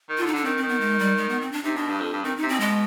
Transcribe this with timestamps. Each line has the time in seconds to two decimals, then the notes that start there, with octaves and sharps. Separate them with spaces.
0.09 D#3
0.18 D3 F4
0.27 D#4
0.33 D3 D4
0.45 D#3 C4
0.57 C4
0.63 D#3
0.68 B3
0.81 G#3
0.99 G3
1.17 G#3
1.29 B3
1.41 C4
1.52 D4
1.64 C3 D#4
1.76 B2 D4
1.88 G2
2.00 F2
2.13 G2
2.24 D#3 C4
2.37 D#4
2.42 C3
2.49 B2 C4
2.60 B2 G#3